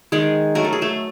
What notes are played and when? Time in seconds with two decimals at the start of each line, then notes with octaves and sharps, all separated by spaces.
0.12 D#3 G#3 G#4
0.55 F#3 A3 A#4
0.64 A4
0.73 G#4
0.81 A3 A4